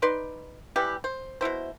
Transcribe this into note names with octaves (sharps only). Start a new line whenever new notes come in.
D#4 B4 D5 C6
E3 G3 G4 B4
C5
B2 A3 E4 C5